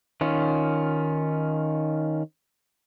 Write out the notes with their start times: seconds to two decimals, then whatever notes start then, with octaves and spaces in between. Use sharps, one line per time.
0.21 D#3 C#4 F4